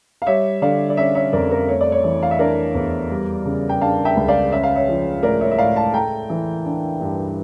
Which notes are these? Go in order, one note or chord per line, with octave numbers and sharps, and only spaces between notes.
F5
G3 C#5 E5
D3 D5 F5
D5
C#4 C#5 E5
C#5 E5
F2 A#4 D5
A#4
A3 C#5
D5
C#5
E3
F5
E5
D4 A#4 D5
E2
G3
C#3
G5
D4 F5 A5
E5 G5
C#2
D5 F5
C#4 E5
F5
C#5 E5
F3
A2 A#4 D5
C#5 E5
E5
A2 D5 F5
F5 A5
A3 G5 A#5
E3
D4
G2